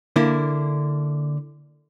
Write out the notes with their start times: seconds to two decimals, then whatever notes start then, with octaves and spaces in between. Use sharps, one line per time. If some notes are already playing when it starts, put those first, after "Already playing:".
0.16 D3 A#3 E4